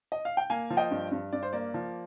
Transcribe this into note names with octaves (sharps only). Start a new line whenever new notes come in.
D#5
F5
G5
A#3 F5 G#5
F3
D#5 G5
G2
G2
G2 D5
C5
A#3 D5
F3